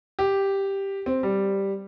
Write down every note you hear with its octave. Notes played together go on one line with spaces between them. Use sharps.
G4
C4
G3